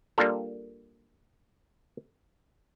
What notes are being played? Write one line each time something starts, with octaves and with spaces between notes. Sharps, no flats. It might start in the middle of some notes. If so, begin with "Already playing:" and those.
G3 A#3 D4 F4 A4